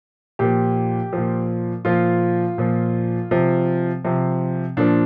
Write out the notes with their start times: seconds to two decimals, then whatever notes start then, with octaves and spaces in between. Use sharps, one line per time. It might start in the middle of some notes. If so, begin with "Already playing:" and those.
0.39 A#2 F3 G4
1.13 A#2 F3
1.85 A#2 F3 F4
2.58 A#2 F3
3.31 C3 F3
4.05 C3 F3
4.77 A#2 F3 D4